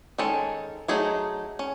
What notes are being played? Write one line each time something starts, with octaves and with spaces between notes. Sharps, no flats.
D#3 G#3 C#4 A4
F#3 A3 D#4 G#4
C#4